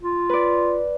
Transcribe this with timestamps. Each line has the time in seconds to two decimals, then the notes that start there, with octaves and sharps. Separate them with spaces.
0.01 F4
0.29 B4 D5